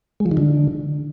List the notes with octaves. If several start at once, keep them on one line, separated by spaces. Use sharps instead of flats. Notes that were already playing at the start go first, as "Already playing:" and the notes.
G#3
F3
D#3
D3